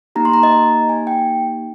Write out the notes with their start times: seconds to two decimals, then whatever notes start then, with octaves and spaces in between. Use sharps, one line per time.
0.15 A#3 D#4 G4 A#5
0.25 C6
0.34 A#5
0.43 D#5
0.52 A#5
0.89 G#5
1.07 G5